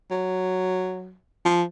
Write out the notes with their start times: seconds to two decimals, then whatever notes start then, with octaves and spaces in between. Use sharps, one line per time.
0.11 F#3
1.45 F3